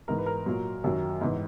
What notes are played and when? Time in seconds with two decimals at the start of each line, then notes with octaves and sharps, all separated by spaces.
0.08 G#2 E3 A#4
0.18 B4
0.26 A#4
0.46 A#2 F#3
0.84 F#2 D#3 F#3
1.21 G#2 E3